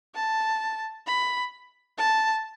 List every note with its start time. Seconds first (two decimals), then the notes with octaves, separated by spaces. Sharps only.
0.15 A5
1.07 B5
1.98 A5